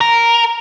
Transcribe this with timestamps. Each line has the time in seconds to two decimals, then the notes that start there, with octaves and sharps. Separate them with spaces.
0.01 A#4